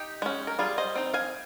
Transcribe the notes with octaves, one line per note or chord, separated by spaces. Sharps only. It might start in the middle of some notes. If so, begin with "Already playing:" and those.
Already playing: D#4 G4
G#3 C#4
A#4
G3 F4 G#4
C5 D#5
C4 D#4
F5 G#5